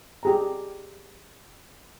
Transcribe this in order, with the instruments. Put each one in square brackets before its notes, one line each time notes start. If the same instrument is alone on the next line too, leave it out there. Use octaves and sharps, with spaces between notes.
[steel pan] G4 G#4 A#5